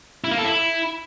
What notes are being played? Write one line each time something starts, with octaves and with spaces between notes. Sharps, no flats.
E4
A#3
A4
E4